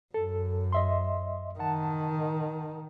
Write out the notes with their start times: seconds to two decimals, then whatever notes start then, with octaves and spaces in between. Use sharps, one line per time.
0.14 F#2 A4
0.73 D#5 E5 C6
1.59 D#3 F#5 A5